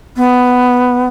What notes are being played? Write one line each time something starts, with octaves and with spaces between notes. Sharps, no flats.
B3